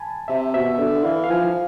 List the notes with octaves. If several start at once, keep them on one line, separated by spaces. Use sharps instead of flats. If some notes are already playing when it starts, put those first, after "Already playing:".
Already playing: G#5 A5 B5
C3 E5
B2 E5
D3
E3 F5
F5
F3 G#5